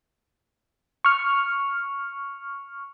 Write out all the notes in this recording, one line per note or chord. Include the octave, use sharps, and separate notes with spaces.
C#6 F6